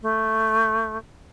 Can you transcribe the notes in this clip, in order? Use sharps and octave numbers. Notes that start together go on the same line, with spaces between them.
A3